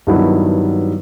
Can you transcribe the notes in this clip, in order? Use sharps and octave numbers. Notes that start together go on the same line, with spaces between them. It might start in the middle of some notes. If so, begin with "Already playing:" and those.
G2 D#3 F#3 B3 E4